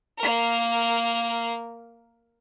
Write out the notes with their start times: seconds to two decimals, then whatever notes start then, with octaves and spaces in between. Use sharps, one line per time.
0.18 A#3 A#4